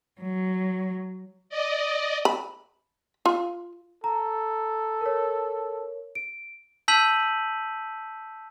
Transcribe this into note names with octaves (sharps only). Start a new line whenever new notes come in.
F#3
D5 D#5
B5
F4
A4 A#5
A#4 C#5
D7
A5 E6 G6 B6 D#7 F#7